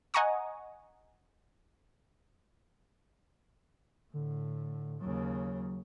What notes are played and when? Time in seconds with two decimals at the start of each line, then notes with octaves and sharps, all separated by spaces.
0.14 D#5 F#5 G#5 A#5 C#6 D#6
4.14 A2 D3
5.01 D#2 C#3 F#3